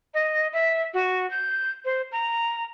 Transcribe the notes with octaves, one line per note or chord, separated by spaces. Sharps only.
D#5
E5
F#4
G6
C5
A#5